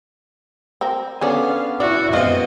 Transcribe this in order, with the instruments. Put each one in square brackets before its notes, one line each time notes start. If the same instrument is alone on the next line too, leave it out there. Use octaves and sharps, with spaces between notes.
[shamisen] C4 A#4
[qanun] B3 C#4 D4 [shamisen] G#4 A4 D5 [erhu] F5
[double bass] E4 [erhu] F#4 [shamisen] D5
[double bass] F#2 [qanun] B2 C4 [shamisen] G#3 C5 F5 [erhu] D#5